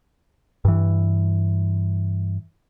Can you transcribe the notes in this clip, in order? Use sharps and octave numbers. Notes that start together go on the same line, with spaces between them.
G2 E3